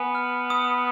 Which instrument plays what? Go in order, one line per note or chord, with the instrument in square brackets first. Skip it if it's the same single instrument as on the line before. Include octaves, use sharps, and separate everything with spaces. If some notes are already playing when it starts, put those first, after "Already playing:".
Already playing: [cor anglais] B3 [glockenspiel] G#5
[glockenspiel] F6
D#6